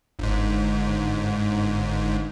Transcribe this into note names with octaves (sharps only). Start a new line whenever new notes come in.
G1 G#2